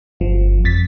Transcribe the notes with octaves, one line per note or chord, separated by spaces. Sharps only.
G1 F3
F2 A6 B6